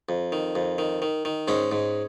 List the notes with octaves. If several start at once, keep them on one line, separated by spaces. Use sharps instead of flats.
F2
D#3
F2
D#3
D#3
D#3
G#2 G#3 C#4
G#2